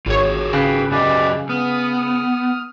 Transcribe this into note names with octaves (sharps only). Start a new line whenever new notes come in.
G#1 F4 F#4 G#4 C#5
C#3 B4 G5
F#2 F#4 G4 B4 D5 D#5
B3 D#6 F6